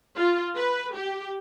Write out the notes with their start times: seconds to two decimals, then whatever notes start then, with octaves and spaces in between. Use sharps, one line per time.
0.17 F4
0.56 B4
0.94 G4